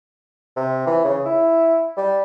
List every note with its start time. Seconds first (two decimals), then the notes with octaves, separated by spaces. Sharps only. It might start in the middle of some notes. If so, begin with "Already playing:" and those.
0.56 C3
0.86 E3
1.04 C#3
1.25 E4
1.97 G3